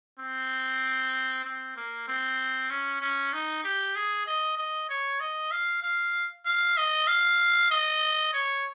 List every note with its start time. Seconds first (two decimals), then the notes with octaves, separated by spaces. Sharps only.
0.20 C4
1.45 C4
1.76 A#3
2.08 C4
2.70 C#4
3.01 C#4
3.33 D#4
3.64 G4
3.96 G#4
4.27 D#5
4.57 D#5
4.89 C#5
5.20 D#5
5.52 F5
5.83 F5
6.45 F5
6.77 D#5
7.07 F5
7.71 D#5
8.33 C#5